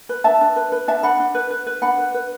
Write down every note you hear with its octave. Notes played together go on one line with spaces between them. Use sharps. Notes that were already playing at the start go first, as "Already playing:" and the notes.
B4
D4 E5 A5
D4
B4
B4
D4 E5 A5
D4 F#5 B5
D4
B4
B4
B4
D4 F#5 B5
B4
B4